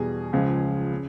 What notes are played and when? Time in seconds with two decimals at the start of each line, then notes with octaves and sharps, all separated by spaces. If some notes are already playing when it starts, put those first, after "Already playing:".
Already playing: E2 B2 G3 G#4
0.33 C#2 C#3 F3 G#3
0.93 C#3